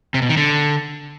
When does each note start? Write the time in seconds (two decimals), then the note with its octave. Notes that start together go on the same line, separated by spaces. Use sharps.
0.14 C3
0.22 B2
0.29 D#3
0.37 D3